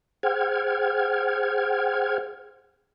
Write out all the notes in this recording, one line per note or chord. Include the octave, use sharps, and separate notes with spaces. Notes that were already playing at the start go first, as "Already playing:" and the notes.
G#4 C5 F#5 G5 F6 G#6